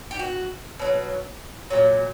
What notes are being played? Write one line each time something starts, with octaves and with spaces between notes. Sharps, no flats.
G4
F#4
B2 F#3
A#2 F#3